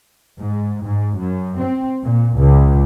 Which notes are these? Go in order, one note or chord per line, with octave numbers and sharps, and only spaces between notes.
G#2
G#2
F#2
C4
A#2
C#2